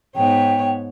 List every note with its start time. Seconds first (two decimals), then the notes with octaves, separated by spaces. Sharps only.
0.16 G#2 B3 C#5 G5